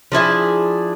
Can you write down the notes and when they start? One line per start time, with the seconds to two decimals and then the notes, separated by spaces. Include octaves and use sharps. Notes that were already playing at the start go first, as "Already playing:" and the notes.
0.12 F3 D4 E4 G#4